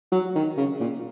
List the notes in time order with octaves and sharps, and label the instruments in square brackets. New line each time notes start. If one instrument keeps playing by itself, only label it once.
[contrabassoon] F#3
D#3
C#3
A#2